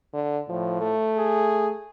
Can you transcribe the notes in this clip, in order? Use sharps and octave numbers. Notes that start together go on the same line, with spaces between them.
D3
A2 F3
A3
G#4